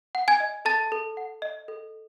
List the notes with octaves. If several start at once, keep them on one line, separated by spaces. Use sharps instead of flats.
F#5
G#5 G#6
D#5
A4 A5 A6
A4
F#5
D#5
A4